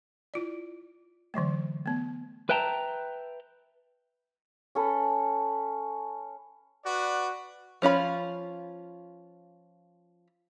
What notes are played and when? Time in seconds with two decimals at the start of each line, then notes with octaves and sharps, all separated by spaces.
0.34 E4 F4 D5
1.34 D3 E3 F#3 A3
1.86 A3 B3
2.49 B4 E5 G5 A5 A#5
4.75 C#4 A4 B4
6.85 F#4 B4 D5
7.82 F3 C#4 F4 B5